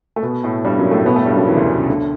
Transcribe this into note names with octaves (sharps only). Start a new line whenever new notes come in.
A3
B2 B3
A2 A3
G2 G3
F#2 F#3
A2 A3
B2 B3
A2 A3
G2 G3
F#2 F#3
E2 E3
D2 D3
C#3
D2 D3